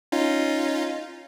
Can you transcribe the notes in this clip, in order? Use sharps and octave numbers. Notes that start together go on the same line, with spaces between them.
C#4 D#4 F4